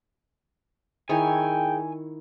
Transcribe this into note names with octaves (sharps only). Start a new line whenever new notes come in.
D#3 E4 G#4 C#5 G5 G#5